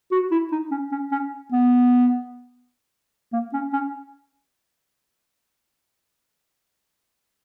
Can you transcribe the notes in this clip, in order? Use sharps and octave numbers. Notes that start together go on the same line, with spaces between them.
F#4
E4
D#4
C#4
C#4
C#4
B3
A#3
C#4
C#4